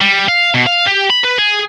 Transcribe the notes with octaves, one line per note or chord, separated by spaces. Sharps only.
G3
F5
B2
F5
G4
B5
B4
G#4